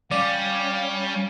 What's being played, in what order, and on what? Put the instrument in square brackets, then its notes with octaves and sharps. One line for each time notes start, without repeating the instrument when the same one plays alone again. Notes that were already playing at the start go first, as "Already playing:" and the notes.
[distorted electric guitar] G3 [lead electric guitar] C#4 [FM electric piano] D5 [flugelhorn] F5